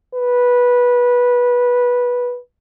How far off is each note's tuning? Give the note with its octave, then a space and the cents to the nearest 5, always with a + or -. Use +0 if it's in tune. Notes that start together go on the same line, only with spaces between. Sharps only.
B4 -15